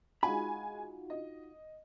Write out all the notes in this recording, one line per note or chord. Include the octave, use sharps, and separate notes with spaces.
G#3 D#4 F4 F#4 G#5 B5
D#5